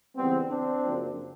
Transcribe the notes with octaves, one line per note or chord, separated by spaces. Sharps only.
C#3 E3 G3 B3 C4
C4 D4
F#2 C#3 F3 A#3